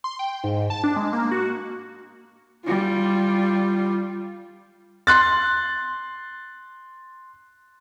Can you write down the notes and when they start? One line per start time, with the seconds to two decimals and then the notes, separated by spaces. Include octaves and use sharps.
0.04 C6
0.19 G5
0.44 G#2
0.70 A5
0.84 D4
0.96 G#3
1.13 A#3
1.31 F#4
2.66 G3 F4
5.07 C6 F#6 A6